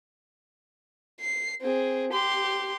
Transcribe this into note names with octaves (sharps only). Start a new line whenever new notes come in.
C7
C4 G#4
G4 C6